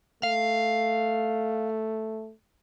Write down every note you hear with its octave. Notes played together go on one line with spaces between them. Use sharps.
A3 F5